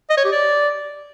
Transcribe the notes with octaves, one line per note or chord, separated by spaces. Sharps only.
D#5
C#5
G4
D5